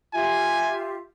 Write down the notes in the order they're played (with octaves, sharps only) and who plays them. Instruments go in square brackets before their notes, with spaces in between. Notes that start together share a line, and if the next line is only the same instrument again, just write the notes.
[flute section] F4 G4 E5 [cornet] G#5